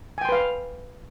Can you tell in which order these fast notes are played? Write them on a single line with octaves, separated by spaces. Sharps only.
G#5 G5 C6 B4 F5